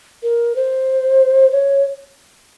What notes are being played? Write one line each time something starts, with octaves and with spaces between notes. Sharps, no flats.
A#4
C5
C#5